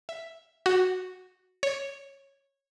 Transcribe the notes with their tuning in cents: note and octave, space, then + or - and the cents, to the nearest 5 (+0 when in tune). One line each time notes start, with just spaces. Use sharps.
E5 +0
F#4 -5
C#5 -10